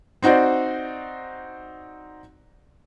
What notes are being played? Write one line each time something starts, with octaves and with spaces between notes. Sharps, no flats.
C4 D#4 F#4 C5 D5